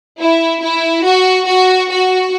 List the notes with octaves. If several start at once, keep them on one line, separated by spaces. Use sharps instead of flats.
E4
E4
F#4
F#4
F#4